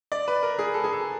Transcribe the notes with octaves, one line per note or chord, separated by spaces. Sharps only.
D5
B4
A#4
G#4
A4
G#4
A4